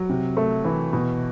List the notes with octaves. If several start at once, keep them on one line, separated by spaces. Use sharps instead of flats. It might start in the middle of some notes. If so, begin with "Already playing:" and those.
Already playing: F#3
C3
A3
E3
B2